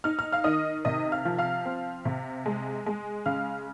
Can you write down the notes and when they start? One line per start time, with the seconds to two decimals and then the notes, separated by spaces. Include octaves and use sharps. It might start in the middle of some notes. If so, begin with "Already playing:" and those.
0.04 D#4 F6
0.19 F6
0.32 F5 F6
0.44 D#3 D#5 D#6
0.85 C3 D#5 D#6
1.12 F5 F6
1.25 F3
1.38 F5 F6
1.65 C4
2.05 C3
2.46 G#3
2.86 G#3
3.26 C#3 F5 F6